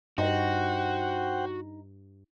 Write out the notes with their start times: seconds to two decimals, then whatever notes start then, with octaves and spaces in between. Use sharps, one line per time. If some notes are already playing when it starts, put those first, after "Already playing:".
0.18 G2 D#4 F#4 C5 F#5 G5